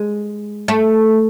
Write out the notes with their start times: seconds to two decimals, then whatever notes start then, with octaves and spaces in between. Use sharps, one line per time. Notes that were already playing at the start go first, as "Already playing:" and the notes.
Already playing: G#3
0.68 A3